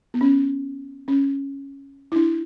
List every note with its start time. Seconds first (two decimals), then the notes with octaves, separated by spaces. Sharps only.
0.14 B3
0.21 C#4
1.08 C#4
2.12 E4
2.16 D4